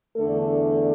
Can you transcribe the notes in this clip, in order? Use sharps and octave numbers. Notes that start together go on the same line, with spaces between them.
E2 D3 A3 D4 A4